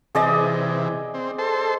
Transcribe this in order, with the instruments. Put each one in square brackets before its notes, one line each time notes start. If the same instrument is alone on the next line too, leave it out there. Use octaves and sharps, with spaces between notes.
[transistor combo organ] C3 E3 [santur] G#4 D5 D#5
[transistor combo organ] C4
A4 C5